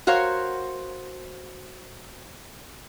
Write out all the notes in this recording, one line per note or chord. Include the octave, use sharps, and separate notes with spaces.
F#4 A#4 C5 C#5 F5